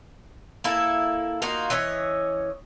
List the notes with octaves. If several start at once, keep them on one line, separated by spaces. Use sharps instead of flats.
A#3 E4 A4
A#3 D#4 F4 F#4
E3 C#4 C#5 D#5